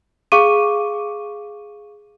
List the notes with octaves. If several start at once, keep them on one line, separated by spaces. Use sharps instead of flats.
G#4 F5 C#6 D6 D#7